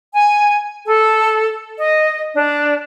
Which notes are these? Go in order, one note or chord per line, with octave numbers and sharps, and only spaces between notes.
G#5
A4
D#5
D4